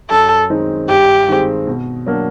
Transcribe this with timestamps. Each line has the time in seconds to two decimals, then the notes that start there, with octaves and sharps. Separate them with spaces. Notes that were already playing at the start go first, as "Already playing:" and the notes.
0.10 F#2 A4
0.50 D#3 G#3 C4 D#4
0.89 G2 G4
1.28 D#3 G#3 C4
1.67 B2
2.06 F#3 A#3 D4